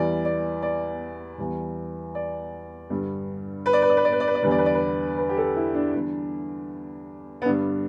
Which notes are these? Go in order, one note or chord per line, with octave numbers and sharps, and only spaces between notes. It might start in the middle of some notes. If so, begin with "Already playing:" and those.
Already playing: E2 E3 G3 D5
D5
D5
E2 E3 G3
D5
G2 D3 G3
B4
D5
B4
D5
B4
D5
B4
D5
B4
D5
E2 D3 G3 B4
D5
B4
D5
B4
B4
G4
A4
E4
D4
E2 D3 G3 D4
B3
G2 D3 G3 D4